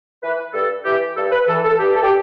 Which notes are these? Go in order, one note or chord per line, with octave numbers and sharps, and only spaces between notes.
E3 B4
G2 A4
E3 G4
G2 A4
B4
E3 A4
A4
G2 G4
A4
G4